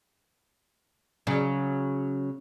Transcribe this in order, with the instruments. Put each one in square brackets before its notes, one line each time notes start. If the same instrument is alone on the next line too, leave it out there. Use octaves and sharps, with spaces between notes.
[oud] C#3 F#3